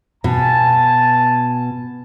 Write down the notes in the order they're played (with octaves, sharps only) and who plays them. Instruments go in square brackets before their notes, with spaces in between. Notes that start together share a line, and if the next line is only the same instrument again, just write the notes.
[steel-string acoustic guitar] B2 [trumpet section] G#5 A5